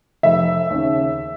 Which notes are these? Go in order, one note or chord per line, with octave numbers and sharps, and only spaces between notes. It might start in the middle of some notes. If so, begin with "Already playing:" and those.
F1 E5
D#2 C#3